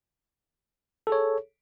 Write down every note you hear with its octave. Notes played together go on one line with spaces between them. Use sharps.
G#4 A4 C#5